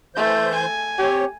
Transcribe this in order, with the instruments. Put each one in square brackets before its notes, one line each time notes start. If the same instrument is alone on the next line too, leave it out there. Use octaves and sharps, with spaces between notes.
[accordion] E3 C5 G6 [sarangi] A3
[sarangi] G#5
[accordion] C4 C#5 [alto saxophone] G4